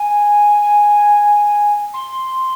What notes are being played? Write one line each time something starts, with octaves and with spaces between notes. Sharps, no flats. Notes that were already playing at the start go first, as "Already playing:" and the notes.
Already playing: G#5
C6